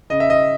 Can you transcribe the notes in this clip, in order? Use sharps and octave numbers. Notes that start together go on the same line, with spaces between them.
C#3 D#5
E5
D#5